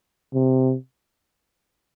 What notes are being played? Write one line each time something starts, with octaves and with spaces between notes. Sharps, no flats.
C3